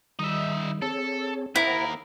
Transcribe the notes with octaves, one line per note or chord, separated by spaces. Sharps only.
D#3 G3 D#4 E5
C4 G#4 A4 C#5
D#2 E4 A#4 C5 F#5